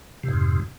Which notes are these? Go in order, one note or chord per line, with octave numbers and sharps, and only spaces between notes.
F2 G#2 C3